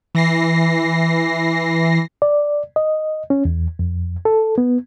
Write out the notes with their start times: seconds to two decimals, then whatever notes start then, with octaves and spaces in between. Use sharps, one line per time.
0.15 E3 A#6 C7
2.22 D5
2.76 D#5
3.30 C#4
3.45 E2
3.79 F2
4.25 A4
4.58 B3